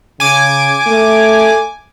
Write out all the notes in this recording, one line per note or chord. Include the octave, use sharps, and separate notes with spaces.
C#3 G#5 D6
A3